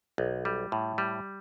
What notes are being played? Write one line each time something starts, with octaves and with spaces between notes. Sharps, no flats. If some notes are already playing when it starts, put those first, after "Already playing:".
B1
G3
A2
G3